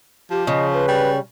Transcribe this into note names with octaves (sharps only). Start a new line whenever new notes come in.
F3 G4
C#3 D#5
B4
G3